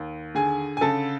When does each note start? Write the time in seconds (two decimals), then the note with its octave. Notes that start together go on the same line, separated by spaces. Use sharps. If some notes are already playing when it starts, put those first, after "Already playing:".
Already playing: D#2
0.35 D3 G#4 G#5
0.77 G#5
0.81 C#3 A4 A5